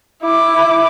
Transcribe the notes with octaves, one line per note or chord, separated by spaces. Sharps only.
E4 D6